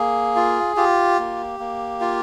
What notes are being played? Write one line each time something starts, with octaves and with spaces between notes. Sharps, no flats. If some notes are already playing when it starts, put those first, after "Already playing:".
Already playing: A#3 G#4
F4
F4 G4
A#3
A#3
F4